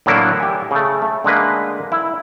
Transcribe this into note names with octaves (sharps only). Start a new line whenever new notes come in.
A2 D3 F#3 A#3 B3 E4
G4 G#5
C#3 A3
A3
D3 G#3 A#3 B4
E4